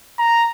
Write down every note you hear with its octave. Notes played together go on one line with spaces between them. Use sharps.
A#5